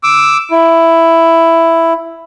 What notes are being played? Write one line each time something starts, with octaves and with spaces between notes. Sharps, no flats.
D6 E6
E4